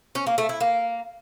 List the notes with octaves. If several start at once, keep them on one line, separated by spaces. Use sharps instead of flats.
C#4
A#3
A3
E4
A#3